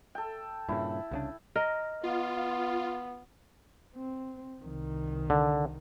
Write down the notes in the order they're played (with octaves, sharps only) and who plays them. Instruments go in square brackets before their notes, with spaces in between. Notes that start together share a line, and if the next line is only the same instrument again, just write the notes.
[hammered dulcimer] A4 G5
[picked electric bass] G2 A#2 C#3 [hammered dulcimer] E4
[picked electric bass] C2 C#3 D4
[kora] A#4 [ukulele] D#5
[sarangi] B3 [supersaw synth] F4
[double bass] C4
C2 D#3
[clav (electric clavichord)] D3